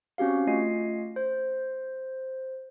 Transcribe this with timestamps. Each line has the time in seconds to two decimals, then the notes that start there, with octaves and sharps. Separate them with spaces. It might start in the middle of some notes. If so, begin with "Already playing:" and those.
0.18 C4 C#4 F#4 G4 F5
0.47 A3 F4 D#5 G#5 C7
1.16 C5